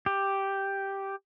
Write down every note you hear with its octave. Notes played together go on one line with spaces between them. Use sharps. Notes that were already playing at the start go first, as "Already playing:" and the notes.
G4